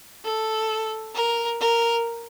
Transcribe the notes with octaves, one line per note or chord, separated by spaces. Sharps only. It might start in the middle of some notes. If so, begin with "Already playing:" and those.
A4
A#4
A#4